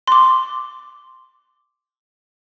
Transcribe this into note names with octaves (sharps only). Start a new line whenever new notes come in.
C6 D6